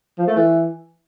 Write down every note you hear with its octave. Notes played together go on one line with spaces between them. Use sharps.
F3
A3
E3